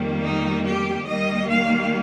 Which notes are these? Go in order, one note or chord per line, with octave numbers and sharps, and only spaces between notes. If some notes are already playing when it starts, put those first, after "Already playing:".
Already playing: F2 D#3 G3 A#3
D#4
G4
D#2 D#3 G3 A#3 D#5
F5